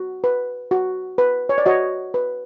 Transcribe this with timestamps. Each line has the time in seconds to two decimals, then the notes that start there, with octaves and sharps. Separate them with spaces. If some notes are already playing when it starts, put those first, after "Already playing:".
Already playing: F#4
0.24 B4
0.71 F#4
1.18 B4
1.49 C#5
1.58 D5
1.66 F#4 C#5 D#5
2.14 B4